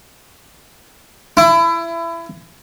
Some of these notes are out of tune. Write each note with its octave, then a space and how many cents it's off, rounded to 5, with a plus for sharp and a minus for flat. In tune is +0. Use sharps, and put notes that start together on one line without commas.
E4 +25